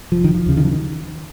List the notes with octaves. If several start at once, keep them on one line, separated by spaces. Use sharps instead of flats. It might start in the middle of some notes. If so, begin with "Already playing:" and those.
F1 F3
D#3
F3
D#2 C#3
D#3
F3
D#3